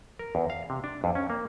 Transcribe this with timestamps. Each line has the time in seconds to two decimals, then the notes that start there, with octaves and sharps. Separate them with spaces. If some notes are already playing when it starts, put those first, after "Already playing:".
0.19 A#4
0.35 E2
0.50 F5
0.70 C3
0.84 D4
1.04 F2
1.15 C#4
1.30 A#3